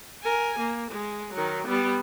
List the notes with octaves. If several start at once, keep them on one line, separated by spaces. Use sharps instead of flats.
A#4 G#5
A#3
G#3
D#3 F#3
G3 B3